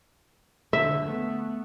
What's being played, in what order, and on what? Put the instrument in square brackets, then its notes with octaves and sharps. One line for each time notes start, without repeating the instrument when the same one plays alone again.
[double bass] D3 [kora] E5
[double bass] A3 B3